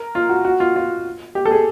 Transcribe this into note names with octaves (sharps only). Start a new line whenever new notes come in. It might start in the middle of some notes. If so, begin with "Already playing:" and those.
Already playing: A#4
F4
F#4
F#4
F4
F4
G4
A4
G#4